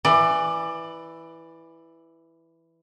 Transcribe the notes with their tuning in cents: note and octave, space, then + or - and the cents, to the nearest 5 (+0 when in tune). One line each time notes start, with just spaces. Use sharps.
E3 +0 D5 +20